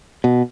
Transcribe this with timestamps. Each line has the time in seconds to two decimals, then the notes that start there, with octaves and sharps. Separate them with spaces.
0.24 B2